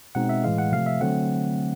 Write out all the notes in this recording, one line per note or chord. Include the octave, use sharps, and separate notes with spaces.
B2 G#3 C4 D#4 F#5
E5
A2 E3 G#3 F5
F#5
C3 F3 A3 F5
E5
D3 F#3 A3 C4 F#5